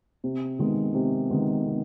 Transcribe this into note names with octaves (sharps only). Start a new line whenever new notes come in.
C3
D#3 G#3 B3
C3
D#3 G#3 B3
C3